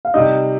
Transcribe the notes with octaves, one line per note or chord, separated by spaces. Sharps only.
F5
C3 G3 D#4 D#5